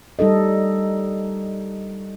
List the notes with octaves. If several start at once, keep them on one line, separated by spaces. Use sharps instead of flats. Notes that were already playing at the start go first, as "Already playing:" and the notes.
G3 D#4 A4 D#5